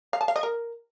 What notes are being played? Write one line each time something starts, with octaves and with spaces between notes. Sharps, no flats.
F5
A5
F5
D#5
A#4